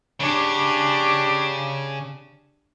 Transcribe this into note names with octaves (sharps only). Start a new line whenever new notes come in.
C#3 D4 G4